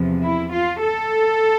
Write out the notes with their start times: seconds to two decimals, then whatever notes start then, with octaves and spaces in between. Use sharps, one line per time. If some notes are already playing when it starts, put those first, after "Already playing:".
Already playing: E2 C3 F3
0.22 E4
0.51 F4
0.80 A4